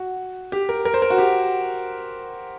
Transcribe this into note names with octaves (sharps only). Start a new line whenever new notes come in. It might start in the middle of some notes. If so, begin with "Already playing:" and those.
Already playing: F#4
G4
A#4
A#4
C5
A#4
F#4
G4